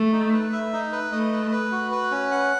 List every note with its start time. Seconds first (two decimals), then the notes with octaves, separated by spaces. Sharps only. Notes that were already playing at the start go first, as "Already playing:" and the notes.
Already playing: A3
0.12 D#4
0.33 B4
0.53 E5
0.73 D#4
0.92 B4
1.12 A3 D#5
1.33 B4
1.52 B4
1.71 F#4
1.91 B4
2.11 C#4
2.31 F#5